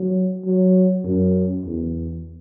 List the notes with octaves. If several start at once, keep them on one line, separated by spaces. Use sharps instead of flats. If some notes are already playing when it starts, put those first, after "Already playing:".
Already playing: F#3
F#3
F#2
E2